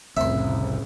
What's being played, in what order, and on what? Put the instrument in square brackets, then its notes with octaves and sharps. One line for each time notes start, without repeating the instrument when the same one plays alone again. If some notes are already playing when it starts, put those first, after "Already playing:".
[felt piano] F1 [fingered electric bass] C2 [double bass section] A2 C#3 [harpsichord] E5 C6